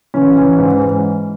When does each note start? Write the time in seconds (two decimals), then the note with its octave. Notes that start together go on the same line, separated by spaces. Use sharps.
0.14 E3 C#4
0.36 E3
0.59 G#2